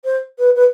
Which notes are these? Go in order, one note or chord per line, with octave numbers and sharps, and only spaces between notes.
C5
B4
B4